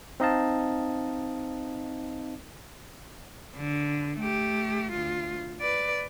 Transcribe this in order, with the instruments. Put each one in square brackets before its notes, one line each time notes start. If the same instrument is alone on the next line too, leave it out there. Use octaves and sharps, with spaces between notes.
[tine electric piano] C4 D#4 D#5 F5 A5
[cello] D3
A3 G4
D2 F4
B4 D5